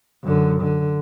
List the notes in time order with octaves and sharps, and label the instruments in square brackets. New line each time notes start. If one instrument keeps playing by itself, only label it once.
[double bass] F#2 D3
D3